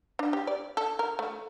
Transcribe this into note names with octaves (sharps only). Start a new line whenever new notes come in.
D4
G4
D5
A4
A#4
A3